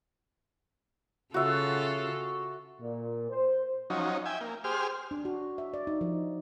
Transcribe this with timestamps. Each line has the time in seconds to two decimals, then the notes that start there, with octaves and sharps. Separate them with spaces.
1.34 C#3 F4 F#4 A4 E5
2.81 A#2
3.30 C5
3.90 F3 F#3 C#4 D#4
4.26 E5 G5 G#5
4.41 A#3
4.64 G4 G#4 C5 F6
5.11 D4
5.25 F#4
5.58 E5
5.74 D5
5.87 D#4
6.01 F3